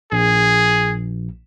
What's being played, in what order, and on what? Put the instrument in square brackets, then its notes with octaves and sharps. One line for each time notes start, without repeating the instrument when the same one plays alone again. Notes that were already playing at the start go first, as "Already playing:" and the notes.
[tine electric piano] A#1 [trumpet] G#4